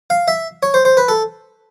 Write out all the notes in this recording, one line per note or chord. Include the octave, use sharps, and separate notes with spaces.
F5
E5
C#5
C5
C5
B4
A4